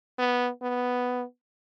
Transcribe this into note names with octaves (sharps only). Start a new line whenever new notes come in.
B3
B3